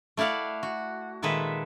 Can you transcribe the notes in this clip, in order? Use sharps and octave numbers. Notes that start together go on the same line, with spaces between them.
A3 E4 D5 F5 F#5
F#4
A#2 D#3 G#3 A4 B4 E5